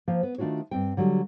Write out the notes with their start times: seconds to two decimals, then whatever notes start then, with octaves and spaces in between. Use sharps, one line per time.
0.08 F3 A#3 C5
0.23 B3
0.38 D#3 A3 D4 F4 F#4 C#5
0.71 G2 C4 G5
0.97 D3 F#3 G3